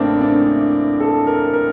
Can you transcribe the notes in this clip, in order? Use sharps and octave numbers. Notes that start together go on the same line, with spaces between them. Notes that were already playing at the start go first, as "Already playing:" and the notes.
Already playing: A1 A2 A3 A#3 C4 D4
D4
A4
A#4
A#4